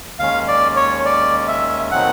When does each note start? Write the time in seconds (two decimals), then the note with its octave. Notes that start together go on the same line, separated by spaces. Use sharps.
0.18 D#2 D#3 G#3 C#4 F5
0.48 D5
0.76 C#5
1.05 D5
1.48 E5
1.91 A#2 F#3 A3 C4 D#4 F#5